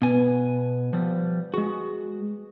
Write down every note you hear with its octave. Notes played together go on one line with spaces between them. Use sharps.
B2 B3 G#5
F3 G3
G#3 F#4 G#4